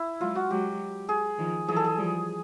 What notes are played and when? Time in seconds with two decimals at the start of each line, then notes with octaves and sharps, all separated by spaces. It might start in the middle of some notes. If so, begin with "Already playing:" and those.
Already playing: E4
0.21 F#3 G#3 F4
0.35 F#4
0.50 F#3 G#3 G4
1.09 G#4
1.39 D#3 F3
1.68 E3 F#3 G#4
1.76 A4
1.84 G#4
1.98 F3 G3